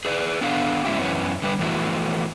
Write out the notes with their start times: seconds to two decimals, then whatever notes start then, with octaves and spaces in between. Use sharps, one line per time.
0.05 G#4 B4 D5
0.41 B3 D4 A4 F5
0.85 G#3 C#4 E4 F#4 G4
0.98 F#2 E3 B3 C#4
1.42 D3 G3 B4
1.59 E3 F3 A3 B3 E4 F#4